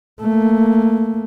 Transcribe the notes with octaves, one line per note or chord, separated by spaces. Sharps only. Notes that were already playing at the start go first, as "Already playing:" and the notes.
A3 A#3